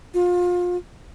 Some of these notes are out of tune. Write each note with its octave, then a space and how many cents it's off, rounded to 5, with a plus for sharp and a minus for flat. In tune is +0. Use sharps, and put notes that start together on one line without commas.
F4 +30